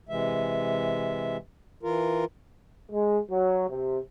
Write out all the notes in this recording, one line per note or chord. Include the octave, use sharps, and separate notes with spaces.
C3 E3 G#3 E5
E3 F4 A#4
G#3
F#3
C3